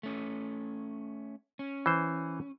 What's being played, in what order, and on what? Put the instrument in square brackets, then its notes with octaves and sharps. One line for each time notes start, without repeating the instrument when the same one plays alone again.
[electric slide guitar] A3 C#4
C#4
[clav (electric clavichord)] E3 C5